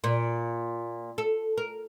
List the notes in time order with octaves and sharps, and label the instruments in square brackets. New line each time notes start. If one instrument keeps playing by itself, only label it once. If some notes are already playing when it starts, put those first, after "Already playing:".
[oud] A#2
A4
A#4